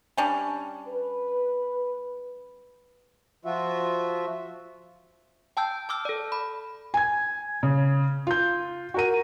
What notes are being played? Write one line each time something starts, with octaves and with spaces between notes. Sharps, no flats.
G3 C#4 D4
B4
F3 F4 F#4 E5
G5 A5 E6 G6
A5 D6 E6 F6
A4 D5
B5
G#5 G#6
C#3
F4 G6
F#4 A#4 D#7